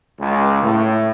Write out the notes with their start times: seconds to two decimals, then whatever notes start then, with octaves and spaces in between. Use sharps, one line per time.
0.20 C#2
0.63 A2